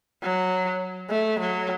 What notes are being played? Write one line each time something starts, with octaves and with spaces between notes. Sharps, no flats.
F#3
A3
F#3